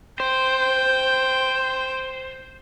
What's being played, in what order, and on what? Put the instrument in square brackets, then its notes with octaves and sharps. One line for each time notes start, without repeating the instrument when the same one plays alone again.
[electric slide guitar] C5 [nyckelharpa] G5